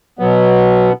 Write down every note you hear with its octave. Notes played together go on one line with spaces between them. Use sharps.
B2 F#3 B3